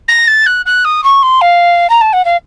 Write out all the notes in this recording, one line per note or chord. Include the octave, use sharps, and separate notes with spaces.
A#6
A6
F#6
F#6
D#6
C#6
C6
F5
A#5
A5
F#5
F5